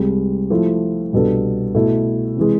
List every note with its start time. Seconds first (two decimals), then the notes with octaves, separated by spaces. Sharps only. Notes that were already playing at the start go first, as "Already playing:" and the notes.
Already playing: C2 C3 G#3
0.50 F3 A3 E4
1.13 C2 B2 B3 D4 A4
1.74 B2 A3 E4 A4
2.36 C3 E3 G#3